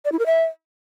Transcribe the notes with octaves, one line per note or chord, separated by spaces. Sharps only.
D5
E4
A#4
E5